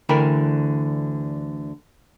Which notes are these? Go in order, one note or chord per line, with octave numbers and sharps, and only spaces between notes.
D2 D3 E3 A#4 G5 B5